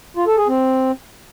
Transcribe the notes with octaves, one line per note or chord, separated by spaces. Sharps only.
F4
A4
G#4
C4